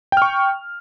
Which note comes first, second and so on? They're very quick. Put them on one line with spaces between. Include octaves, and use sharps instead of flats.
G5 F6 C#6